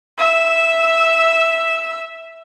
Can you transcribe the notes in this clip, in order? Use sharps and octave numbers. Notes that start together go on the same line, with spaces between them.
E5 E6